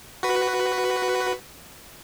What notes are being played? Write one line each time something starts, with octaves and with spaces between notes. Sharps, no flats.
F#4 B4